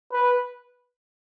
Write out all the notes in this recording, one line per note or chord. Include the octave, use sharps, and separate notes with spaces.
B4